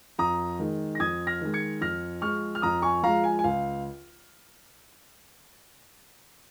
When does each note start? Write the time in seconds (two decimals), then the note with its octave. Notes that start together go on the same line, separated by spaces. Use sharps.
0.19 F2 A#5 D#6
0.59 D#3 G#3
0.95 A#6
0.99 F2 D#6 G#6
1.27 F6 A#6
1.41 D#3 G#3
1.54 G#6 C#7
1.81 F2 F6 A#6
2.22 F3 G#3 C#6 F6
2.55 F6
2.62 F2 A#5 D#6
2.82 G#5 C#6
3.03 F3 G#3 F5 A#5
3.24 G#5
3.39 G#5
3.44 C#2 F5